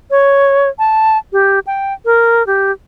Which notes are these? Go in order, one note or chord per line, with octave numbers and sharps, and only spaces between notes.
C#5
A5
G4
G5
A#4
G4